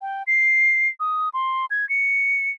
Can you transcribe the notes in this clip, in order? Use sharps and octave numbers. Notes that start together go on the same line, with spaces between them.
G5
C7
D#6
C6
G#6
C#7